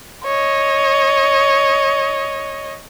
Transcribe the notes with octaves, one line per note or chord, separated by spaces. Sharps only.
C#5 D#5